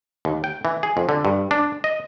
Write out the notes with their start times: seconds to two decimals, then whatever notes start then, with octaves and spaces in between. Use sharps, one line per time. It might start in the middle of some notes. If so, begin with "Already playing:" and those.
0.25 D#2
0.44 G5
0.65 E3
0.83 G#4
0.97 F2
1.09 D3
1.25 G2
1.51 D4
1.84 D#5